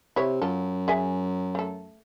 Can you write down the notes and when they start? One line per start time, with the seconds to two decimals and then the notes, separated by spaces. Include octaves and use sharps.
0.16 C3 E4 C#5
0.42 F#2 F4 A4
0.88 G#4 E5 G#5
1.55 A3 A4